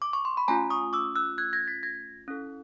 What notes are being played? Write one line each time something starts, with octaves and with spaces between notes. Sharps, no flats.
D6
C#6
C6
B5
A3 C#4 F4 G#5 A#5
C#6 D#6
D6 E6
E6 F#6
F#6 G#6
G#6 A#6
A6 B6
G#6 A#6
C#4 E4 A4